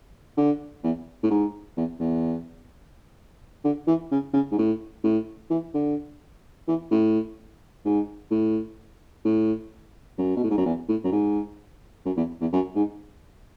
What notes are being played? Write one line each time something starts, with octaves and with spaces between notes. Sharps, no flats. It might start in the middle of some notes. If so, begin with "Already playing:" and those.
D3
E2
A2
G#2
E2
E2
D3
E3
C#3
C#3
G#2
A2
A2
E3
D3
E3
A2
G#2
A2
A2
F#2
B2
A2
G#2
F#2
E2
A2
F#2
G#2
F#2
E2
E2
F#2
G#2